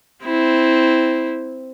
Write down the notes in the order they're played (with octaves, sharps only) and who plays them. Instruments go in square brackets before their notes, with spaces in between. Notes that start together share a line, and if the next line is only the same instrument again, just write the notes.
[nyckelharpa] C4 E4